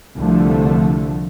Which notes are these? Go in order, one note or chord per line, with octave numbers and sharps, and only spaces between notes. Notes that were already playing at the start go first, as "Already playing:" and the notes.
C2 D3 F3 A3